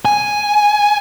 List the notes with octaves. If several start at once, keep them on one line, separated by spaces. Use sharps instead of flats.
G#5